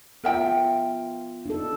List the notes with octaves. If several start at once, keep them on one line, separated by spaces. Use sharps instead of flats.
B3 F4 A#4 E5 G5
D4 D#4 A4